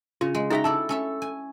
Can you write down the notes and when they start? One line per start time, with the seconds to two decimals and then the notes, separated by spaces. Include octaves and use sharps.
0.21 C#3 F4
0.35 G#3
0.50 D#4 F#4 G#4 E5 G5 A#5
0.64 E4 A4 D5 A5
0.89 C#4 A4 E5
1.22 G#5